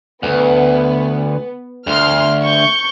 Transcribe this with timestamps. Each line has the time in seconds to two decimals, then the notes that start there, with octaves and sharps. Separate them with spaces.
0.23 D2 B3
1.87 D2 C6 F6
2.46 C#6 G6